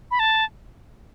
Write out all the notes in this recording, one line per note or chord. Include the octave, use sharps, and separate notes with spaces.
B5
A5